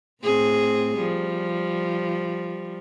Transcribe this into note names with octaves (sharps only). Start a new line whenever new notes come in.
A2 C4 G#4
F3 G3